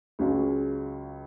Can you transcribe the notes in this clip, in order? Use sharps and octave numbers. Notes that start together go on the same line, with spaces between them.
C#2 C#3 F#3 C#4 F4